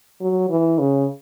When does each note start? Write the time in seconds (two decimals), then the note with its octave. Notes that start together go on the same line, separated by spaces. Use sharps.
0.21 F#3
0.50 E3
0.79 C#3